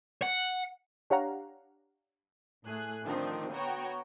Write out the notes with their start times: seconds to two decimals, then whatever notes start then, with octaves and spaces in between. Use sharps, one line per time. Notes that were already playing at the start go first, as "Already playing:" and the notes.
0.22 F#5
1.10 D4 G4 C#5 F5 F#5 A#5
2.66 A2 A3 G#4 F#6
3.05 D3 D#3 F3 C4 D4 D#4
3.52 B3 F#4 C#5 G5 A#5